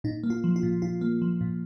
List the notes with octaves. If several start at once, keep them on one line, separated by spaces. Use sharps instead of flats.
A#2 D#4
A#3
F4
F3
F4
A#2
A#2 F4
A#3
F3
A#2